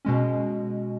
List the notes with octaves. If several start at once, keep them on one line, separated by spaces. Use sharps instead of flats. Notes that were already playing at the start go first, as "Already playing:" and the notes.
B2 G#3 C#4